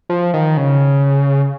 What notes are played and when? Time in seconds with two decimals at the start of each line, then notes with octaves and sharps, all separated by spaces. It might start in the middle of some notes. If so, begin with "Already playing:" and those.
0.10 F3
0.34 D#3
0.57 C#3